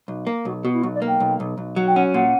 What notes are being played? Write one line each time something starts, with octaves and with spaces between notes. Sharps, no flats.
B1
A#3
B1 F#4
B2 F#4
E4
B1 F#4
D5
A#3
G5
B1
B1
B1
F#3
G5
C#4 F#5
A#2 F#5